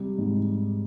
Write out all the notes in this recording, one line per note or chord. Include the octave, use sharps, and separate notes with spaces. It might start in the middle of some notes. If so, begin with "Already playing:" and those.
Already playing: C3 G3
G#2